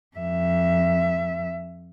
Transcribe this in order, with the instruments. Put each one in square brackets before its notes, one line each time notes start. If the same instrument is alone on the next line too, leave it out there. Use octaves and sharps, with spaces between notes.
[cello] F2 E5